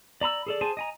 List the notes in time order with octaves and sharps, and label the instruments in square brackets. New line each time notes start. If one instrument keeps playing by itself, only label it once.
[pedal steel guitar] D5 A#5 B5 E6
G#4 A4 D5
G#4 C5 G#5 A5
D#5 G#5 A#5